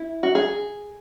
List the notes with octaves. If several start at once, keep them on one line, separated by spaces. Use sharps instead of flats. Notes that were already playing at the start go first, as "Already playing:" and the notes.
Already playing: E4
F#4
G#4